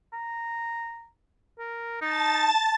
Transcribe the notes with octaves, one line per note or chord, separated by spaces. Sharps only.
A#5
A#4
D#4 A5 A6